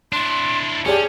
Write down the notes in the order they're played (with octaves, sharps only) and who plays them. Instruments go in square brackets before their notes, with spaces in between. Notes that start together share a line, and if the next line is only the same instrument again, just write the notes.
[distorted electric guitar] D4 E4 [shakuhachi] C6
[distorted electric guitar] C#4 [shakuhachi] G4 [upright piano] G#4 D5 A5